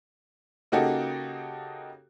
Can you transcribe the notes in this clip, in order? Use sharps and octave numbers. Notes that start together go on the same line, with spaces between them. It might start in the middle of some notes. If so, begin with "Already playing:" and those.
C#3 A#3 D#4 F#4 G4 A4